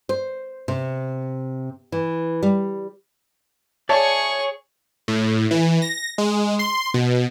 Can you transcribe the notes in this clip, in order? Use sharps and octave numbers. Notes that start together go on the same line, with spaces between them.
C5
C3
E3
G3
G#4 C#5 D5 E5 A5 C#6
A2
E3
A#6
G#3
C6
B2